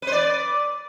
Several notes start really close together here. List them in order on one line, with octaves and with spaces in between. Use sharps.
B4 C5 D5